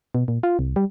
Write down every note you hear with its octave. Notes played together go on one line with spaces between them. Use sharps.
B2
A#2
F4
C2
G3